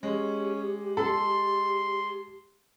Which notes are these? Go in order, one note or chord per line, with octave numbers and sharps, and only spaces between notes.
G#3 C#4 G4
A4 C6